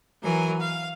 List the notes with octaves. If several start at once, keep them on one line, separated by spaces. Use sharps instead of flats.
E3 F#3 A#4 G#5
F5